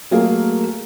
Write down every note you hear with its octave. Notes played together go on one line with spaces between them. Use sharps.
F#3 A3 A#3 G#4 A#4 F5